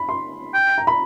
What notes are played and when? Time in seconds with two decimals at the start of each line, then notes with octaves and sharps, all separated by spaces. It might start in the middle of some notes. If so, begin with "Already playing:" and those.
Already playing: B5
0.09 C6
0.53 G5
0.78 A#5
0.87 B5